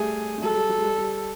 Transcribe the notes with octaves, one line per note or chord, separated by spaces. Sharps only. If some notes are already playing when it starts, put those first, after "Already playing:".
Already playing: G3 A3 G#4
A3
F#3 G#3 A4
G3
F#3
G#3
G3
G3